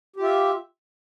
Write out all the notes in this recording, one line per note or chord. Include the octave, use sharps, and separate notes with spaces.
F4 G4 E5